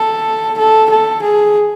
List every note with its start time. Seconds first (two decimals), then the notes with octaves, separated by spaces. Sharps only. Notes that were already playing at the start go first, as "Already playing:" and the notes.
Already playing: A4
0.58 A4
0.90 A4
1.22 G#4